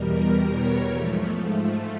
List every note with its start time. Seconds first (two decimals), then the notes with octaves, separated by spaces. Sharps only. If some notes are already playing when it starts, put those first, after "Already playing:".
Already playing: E2 B2 G3 A#4
0.53 C#5
0.85 G#2 F3 A3